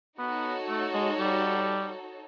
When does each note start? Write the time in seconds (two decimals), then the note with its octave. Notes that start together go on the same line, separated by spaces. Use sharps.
0.19 B3 D#4 F#4 A4 C#5
0.68 A3
0.94 G#3
1.19 G3